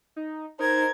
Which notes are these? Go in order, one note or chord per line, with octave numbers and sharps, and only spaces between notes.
D#4
D#4 A#4 C5 G#6